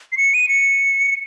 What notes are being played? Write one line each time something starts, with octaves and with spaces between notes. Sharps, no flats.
C7
C#7
D#7
C#7